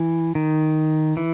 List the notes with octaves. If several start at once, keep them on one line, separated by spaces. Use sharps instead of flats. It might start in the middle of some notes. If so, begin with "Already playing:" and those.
Already playing: E3
D#3
E3